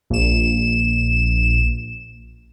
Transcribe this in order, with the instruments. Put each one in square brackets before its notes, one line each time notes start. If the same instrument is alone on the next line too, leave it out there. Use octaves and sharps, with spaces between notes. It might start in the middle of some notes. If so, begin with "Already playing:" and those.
[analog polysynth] A#1 E7